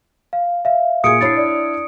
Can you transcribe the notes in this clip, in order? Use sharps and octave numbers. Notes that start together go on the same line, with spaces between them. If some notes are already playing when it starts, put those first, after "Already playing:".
F5
E5 F5
A#2 G#4 D#6 G#6 C#7 D7
D4 E4 C#5 A6 C7
D5